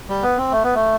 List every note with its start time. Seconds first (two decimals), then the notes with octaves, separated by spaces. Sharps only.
0.09 G3
0.23 B3
0.37 C4
0.52 A3
0.63 B3
0.75 A3